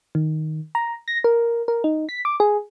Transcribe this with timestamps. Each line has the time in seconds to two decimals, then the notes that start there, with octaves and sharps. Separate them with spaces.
0.15 D#3
0.75 A#5
1.08 A#6
1.24 A#4
1.68 A#4
1.84 D#4
2.09 B6
2.25 D6
2.40 G#4